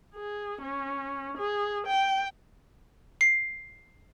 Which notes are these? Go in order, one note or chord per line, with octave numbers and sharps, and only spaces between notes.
G#4
C#4
G#4
G5
C7